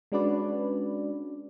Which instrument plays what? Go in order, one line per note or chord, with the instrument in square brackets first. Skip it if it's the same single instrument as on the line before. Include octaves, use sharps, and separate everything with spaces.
[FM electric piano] G#3 C#4 D4 F#4 B4 D5